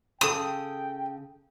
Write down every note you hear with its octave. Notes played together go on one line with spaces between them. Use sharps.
C#3 A4 G5 D#6